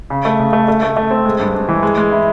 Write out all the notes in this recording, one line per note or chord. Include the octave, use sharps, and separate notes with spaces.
C#3
A3
C#3
A3
A3
A3
A3
C4
G#3
G2
G2
E3
G#3
G#3
E4